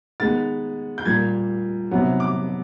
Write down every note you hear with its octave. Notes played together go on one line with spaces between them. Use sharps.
D#3 G#3 B3 A6
G6
A#2 G3 A#3 G#6
C3 D#3 F#3 B3
D6